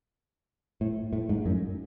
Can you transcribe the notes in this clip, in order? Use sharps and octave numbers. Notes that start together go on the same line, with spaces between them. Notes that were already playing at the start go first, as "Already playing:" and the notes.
A2
A2
G#2
F#2